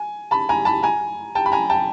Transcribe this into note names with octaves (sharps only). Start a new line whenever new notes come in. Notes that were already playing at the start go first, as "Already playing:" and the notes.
Already playing: G#5
A5 B5
G#5 A#5
A5 B5
G#5 A#5
G5 A5
B5
G#5 A#5
G5 A5